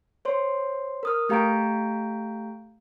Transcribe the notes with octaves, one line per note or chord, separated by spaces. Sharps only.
C5 C#5 C6
A#4 D#6 F6
A3 G4 F5 A#5 G6 D7